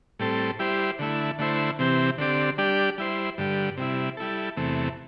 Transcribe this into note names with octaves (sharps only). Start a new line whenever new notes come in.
A2 G3 C4 A4
G3 E4 G4 C5
D3 A3 E4
D3 A3 E4 C5
C3 E3 C4 G4
D3 C4 G4 D5
G3 D4 G4 D5
G3 E4 C5
G2 D3 G3
C3 G3 E4
G3 E4 A4
E2 C3 A3